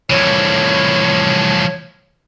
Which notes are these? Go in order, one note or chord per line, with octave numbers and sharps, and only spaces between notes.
C2 A2 E3 F3 C#5